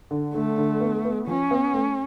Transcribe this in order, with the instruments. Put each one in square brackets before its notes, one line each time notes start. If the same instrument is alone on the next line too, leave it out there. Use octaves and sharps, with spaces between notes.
[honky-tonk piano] D3
[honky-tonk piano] D3 [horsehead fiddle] A3
[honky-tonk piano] D3
B3
B3
[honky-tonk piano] F3 [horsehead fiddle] C#4
[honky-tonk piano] B3
A3